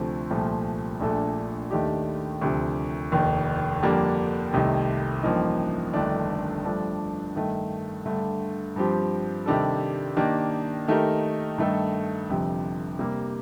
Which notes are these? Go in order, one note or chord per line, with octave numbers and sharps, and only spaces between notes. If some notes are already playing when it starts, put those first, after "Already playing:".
Already playing: D2 C3 F3 A3 C4
C2 A#2 F3 A3
A#1 A#2 A3 D4 A4
D#2 D#3 A3 D4 G4
D2 C3 F3
F1 D#2 D#3
F2 D3 G3 A#3 D4
C2 C3 D#3 A3
A1 G2 F3 A#3 D#4
G1 F2 D#3 A3 D4
G2 F3 A3 D4
G2 D#3 A3
G2 D3 A3
G2 F3 C4 G4
C3 D#3 G3 D4 A4
D#3 A#3 D4 G4
D#3 A3 D#4 G4 A#4
G2 D#3 A3 D#4 A4
G1 F2 C3
C3 G3 A#3